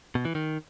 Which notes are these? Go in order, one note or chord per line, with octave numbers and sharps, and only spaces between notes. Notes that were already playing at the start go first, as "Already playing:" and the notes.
B2
E3
D#3